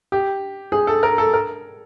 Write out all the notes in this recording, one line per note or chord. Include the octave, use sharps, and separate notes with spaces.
G4
G#4
A4
A#4
A4
A#4